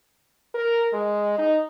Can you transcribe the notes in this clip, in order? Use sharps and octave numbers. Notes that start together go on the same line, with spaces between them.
A#4
G#3
D#4